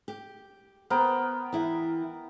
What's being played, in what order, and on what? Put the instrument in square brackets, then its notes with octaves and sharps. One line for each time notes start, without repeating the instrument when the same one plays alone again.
[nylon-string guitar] G4
[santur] B3 A#4 G5 [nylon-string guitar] C5
[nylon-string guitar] E3 E4